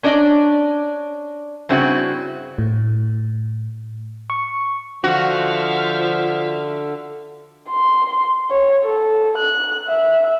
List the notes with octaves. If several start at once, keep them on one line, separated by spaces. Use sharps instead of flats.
C#4 D4 D5 D#5
G2 C#3 C4 E4 F#4
A2
C#6
D3 F3 F#4 E5 F5
C6
C#5
A4
F#6
E5